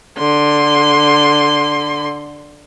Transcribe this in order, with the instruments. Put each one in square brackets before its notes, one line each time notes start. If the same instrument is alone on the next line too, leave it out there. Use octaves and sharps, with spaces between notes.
[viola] D3 C6